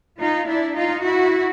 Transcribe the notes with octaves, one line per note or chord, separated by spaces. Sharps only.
D#4 F4
D4 E4
D#4 F4
E4 F#4